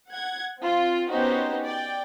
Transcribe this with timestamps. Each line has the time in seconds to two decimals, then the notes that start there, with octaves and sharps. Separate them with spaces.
0.11 F#5 G#6
0.58 C4 F4
1.09 B3 C#4 D#4 F#4 G4 C5
1.64 D5 G5